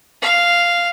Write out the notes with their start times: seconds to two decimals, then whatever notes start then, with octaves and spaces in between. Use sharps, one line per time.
0.22 F5